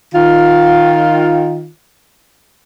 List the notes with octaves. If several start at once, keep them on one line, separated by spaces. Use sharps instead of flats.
D#3 F4